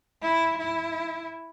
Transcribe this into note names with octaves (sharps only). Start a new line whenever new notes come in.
E4
E4